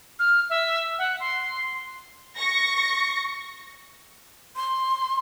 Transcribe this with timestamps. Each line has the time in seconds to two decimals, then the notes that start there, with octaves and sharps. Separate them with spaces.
0.19 F6
0.50 E5
0.99 F#5
1.20 C6
2.37 C#6 A#6
4.56 C6